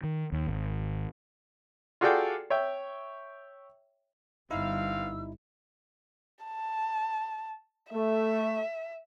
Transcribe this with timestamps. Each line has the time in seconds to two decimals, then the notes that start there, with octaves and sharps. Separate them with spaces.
0.03 D#3
0.32 D#2
0.47 G#1
2.01 F4 F#4 G#4 A4 D5 G5
2.50 C#5 E5 G5
4.51 G1 B3 C4 D#4 E4 F5 E6
6.45 A5
7.93 A3 E5